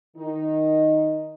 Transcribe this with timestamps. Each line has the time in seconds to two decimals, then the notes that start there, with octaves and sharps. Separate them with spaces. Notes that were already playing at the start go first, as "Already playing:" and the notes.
0.17 D#3 D#4